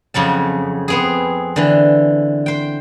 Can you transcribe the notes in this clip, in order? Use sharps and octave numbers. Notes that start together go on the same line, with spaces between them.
F2 C#3 F#3 A5
B3 C4 G#4
D3 E3
C5 G5